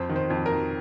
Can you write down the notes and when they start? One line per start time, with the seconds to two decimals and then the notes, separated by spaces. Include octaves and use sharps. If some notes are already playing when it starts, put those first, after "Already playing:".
Already playing: F2 C5
0.09 D#3
0.16 C5
0.30 F2
0.46 A#4
0.52 D#3